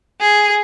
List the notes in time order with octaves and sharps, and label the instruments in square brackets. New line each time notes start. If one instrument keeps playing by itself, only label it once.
[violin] G#4